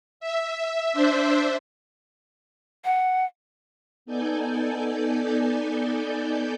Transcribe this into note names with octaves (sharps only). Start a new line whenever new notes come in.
E5
D4 C5 E5
F#5
B3 D#4 A4 D5 G#5 G6